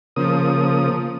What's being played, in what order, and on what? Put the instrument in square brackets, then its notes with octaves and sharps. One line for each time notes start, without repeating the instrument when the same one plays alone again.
[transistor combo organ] C#3 A#3 D#6 [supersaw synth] F3